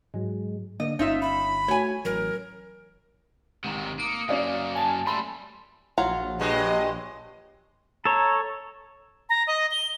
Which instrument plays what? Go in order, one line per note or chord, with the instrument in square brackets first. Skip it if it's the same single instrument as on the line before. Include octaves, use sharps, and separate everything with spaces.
[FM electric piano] G#2 F#3 [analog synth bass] G#3
[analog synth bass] D3 [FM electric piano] A#3 [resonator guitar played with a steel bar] D#5
[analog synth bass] G1 [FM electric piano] C#4 [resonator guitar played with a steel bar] D#4 F4 E5
[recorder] B5
[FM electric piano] A3 F#4 [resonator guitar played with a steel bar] C#5 G#5
[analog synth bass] A1 [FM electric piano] F#3 [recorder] A#4
[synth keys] G#1 [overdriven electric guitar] C3 D#3
[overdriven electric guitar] A#3 [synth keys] D#6 C#7
[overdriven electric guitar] F#2 A#3 [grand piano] C#4 D5 F5
[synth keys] G#5 A5
[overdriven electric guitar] G3 A3 [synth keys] B5 [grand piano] C6
[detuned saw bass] A#1 [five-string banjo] F#3 F4 A#5
[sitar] G2 G#3 [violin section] D#5
[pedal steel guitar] A4 C#5 [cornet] A#5
[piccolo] A#5
D#5
G7